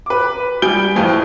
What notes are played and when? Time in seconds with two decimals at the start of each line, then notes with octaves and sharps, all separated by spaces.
0.06 B4 D6
0.62 G3 G#5 G6 D7 G7
0.95 F2 A2 E3 F3